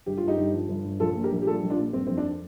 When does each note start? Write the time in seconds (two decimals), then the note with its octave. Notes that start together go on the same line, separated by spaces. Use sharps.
0.06 G1 G4
0.17 G2 F4
0.28 D#4 G4
0.37 G1
0.53 F3
0.69 G1
0.85 G2
1.00 A#1 F4 A4
1.15 A#2
1.24 G4 A#4
1.32 A#1
1.42 G4
1.47 G3 F4 A4
1.63 A#1
1.70 D4 F4
1.79 A#2
1.93 G1 C4
2.07 F2 C4
2.17 D4